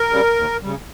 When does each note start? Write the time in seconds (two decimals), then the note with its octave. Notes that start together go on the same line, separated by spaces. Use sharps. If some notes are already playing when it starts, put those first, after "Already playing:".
Already playing: A#4
0.10 C#3 G3
0.36 D#2
0.62 C#3 G3